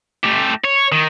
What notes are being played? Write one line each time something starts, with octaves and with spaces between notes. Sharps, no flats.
A3 G4
C#5
D#3